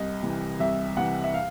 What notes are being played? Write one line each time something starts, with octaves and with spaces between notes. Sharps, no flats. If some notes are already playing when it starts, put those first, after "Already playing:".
Already playing: C2 D#5
C3 E3
C2 E5
C3 E3 F#5
E5
F5